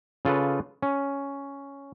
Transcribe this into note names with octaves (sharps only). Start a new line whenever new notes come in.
C#3 F4 A4 B4
C#4